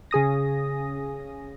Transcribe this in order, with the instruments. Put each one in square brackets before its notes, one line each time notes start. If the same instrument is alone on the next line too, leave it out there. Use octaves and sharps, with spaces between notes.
[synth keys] C#3 G#4 D#6 A#6